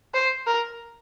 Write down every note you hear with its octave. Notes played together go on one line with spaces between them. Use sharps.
C5
A#4